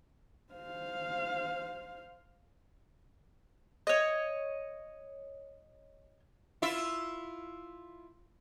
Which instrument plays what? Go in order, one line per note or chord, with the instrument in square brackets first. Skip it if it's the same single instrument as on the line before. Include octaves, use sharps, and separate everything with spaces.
[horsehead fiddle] C5 F5
[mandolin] C#5 D#5
[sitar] E4 F4 E5